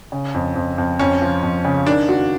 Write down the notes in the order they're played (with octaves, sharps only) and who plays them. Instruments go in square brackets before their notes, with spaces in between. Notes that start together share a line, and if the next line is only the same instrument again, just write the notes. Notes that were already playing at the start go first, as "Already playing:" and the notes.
[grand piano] C#3
F2
F2
F2
[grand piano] F2 [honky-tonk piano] C#4
[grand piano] F3
F2
C#3
[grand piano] D#3 [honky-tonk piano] D4
[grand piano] F#4